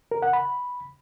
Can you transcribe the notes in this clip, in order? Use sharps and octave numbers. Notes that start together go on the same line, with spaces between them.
A#4
F#5
B5